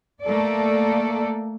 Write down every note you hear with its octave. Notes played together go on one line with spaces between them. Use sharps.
A3 A#3 A4 D5